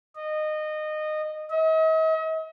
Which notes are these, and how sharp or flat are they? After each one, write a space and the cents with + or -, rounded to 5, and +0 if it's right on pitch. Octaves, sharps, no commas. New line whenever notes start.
D#5 -20
D#5 +45